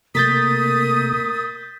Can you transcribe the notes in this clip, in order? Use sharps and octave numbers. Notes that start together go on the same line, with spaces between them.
C3 A3 A#3 A#4 D#6 G6 A6 B6